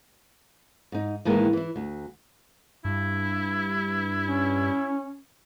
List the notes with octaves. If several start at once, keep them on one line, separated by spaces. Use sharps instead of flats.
G#2 D#4
A2 D#3 E3 G#3 A#3
E3 E4
D2
G2 E4
C#4